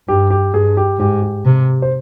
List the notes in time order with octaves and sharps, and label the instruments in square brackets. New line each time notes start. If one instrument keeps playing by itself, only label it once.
[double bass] G2 [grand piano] G4
[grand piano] G4
[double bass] G2 [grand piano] G#4
[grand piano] G4
[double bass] G#2 [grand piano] G4
[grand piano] G4
[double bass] C3
[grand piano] C5